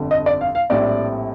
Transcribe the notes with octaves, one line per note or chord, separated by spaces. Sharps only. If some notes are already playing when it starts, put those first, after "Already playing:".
Already playing: G1 F2 D3 A3
D#5
D5
F5
F5
A#1 A2 G3 C4 D5